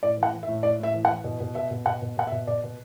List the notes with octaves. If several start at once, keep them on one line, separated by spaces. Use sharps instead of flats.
A2 D5
E3
F#5
E3
E5
A2
A2 D5
A2 E5
E3
F#5
E3
B2
B2
B2 E5
B2
B2 F#5
B2
B2 F#5
E5
B2
B2 D5
B2